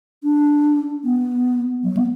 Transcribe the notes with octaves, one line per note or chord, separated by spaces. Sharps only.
D4
B3
F#3
B3